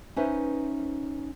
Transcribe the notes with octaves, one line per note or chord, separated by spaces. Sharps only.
C#4 D#4 B4 C5 E5